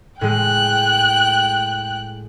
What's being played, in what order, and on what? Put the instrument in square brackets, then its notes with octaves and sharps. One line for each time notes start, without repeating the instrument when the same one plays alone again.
[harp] A2 G#3 [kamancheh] G5 F#6